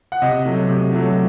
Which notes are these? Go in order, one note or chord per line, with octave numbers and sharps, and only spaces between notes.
F#5
C3 D#5
F#3 A3
C3
F#3 A3